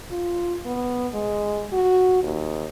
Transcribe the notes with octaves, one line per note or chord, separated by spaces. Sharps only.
F4
B3
G#3
F#4
D#2